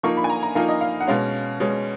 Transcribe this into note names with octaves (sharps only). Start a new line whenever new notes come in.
F3 A#3 D#4 C#6
B5
G#5
A#5
A#5
F3 A#3 D#4 F5
D#5
F5
F#5
B2 G#3 C#4 F5
B2 G#3 C#4